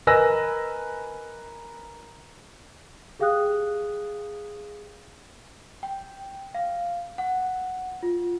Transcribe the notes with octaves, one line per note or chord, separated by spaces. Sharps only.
A#4 B4 D#5 G#5 E6 A#6
G4 G#4 F5 G5 D#6 F#6
G5
F5
F#5
F4